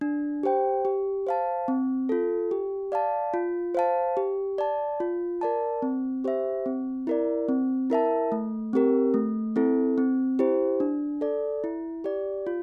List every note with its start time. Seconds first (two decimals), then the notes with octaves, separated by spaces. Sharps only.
0.01 D4
0.43 G4 C5 G5
0.85 G4
1.27 C5 F5 A5
1.68 C4
2.09 F4 A4
2.51 G4
2.92 D5 F5 A5
3.34 F4
3.75 C5 F5 A5
4.17 G4
4.58 D5 A5
5.00 F4
5.41 A#4 D5 A5
5.82 C4
6.24 G4 C5 E5
6.66 C4
7.07 E4 A#4 D5
7.49 C4
7.90 E4 A#4 E5 A5
8.32 A3
8.73 C4 G4 A#4
9.14 A3
9.56 C4 E4 A4
9.98 C4
10.39 E4 G4 C5
10.80 D4
11.21 A4 D5
11.64 E4
12.04 G4 D5
12.47 F4